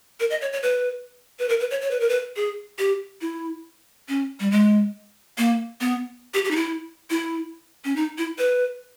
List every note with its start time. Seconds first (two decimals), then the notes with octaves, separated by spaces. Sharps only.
0.20 A#4
0.30 D#5
0.41 C#5
0.53 C#5
0.63 B4
1.39 B4
1.49 A#4
1.60 B4
1.70 C#5
1.81 C#5
1.91 B4
2.00 A#4
2.09 B4
2.36 G#4
2.79 G4
3.21 E4
4.09 C#4
4.40 G3
4.51 G#3
5.38 A#3
5.81 B3
6.34 G4
6.45 G4
6.51 D#4
6.56 E4
7.10 E4
7.85 C#4
7.96 D#4
8.18 E4
8.38 B4